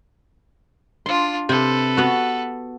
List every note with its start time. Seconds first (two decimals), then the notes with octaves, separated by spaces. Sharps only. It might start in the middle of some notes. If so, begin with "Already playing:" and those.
1.06 D4 F4 C6
1.49 C3 C4 A4 B4
1.97 B3 F#4